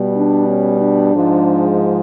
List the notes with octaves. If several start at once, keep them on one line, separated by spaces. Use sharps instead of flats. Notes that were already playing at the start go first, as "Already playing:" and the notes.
Already playing: B2 G3
D4
C#4
D4
G#2 F3 G#3